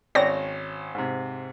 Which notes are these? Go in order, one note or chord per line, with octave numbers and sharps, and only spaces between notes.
G#1 C#4 C#5 D5 G5 A#6
G#2 C3